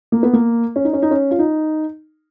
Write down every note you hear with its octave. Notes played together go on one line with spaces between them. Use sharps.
A#3
B3
A#3
C#4
D#4
C#4
D#4
C#4
F4
D#4